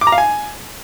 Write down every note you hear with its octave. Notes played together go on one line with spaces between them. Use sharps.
D6
A#5
F5
G#5